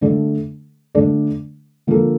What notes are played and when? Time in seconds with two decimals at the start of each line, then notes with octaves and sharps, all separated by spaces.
0.01 D3 A3 D4 A4 D5
0.95 D3 A3 D4 A4 D5
1.87 D3 F3 A#3 F4 A4